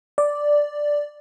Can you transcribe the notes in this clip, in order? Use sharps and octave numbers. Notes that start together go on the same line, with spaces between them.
D5